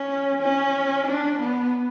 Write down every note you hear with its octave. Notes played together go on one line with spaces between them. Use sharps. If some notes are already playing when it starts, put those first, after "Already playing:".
Already playing: C#4
C#4
D4
B3